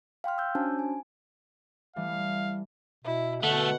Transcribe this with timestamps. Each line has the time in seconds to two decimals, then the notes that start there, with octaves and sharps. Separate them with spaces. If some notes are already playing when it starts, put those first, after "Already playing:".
0.24 F5 G5 C6 F6
0.38 E6 G6
0.55 C#4 D4 F#4 C5 G#5 A5
0.79 G#5
1.96 E3 G3 A3 F5
3.05 B2 E4
3.43 B2 D3 A3 F#5